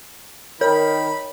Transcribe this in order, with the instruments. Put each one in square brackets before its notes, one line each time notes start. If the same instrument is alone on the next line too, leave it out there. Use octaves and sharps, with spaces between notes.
[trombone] D#3 [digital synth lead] A#4 [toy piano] C#5 [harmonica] B5